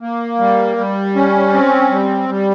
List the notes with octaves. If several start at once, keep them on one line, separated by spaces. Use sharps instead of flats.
A#3
G3
G3
C#4
C4
G3
G3